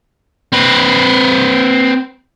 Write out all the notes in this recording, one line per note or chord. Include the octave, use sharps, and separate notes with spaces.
C4 B4